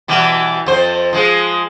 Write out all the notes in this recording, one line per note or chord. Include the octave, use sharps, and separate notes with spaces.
B2 E3 G3
F2 C5
F3 G#3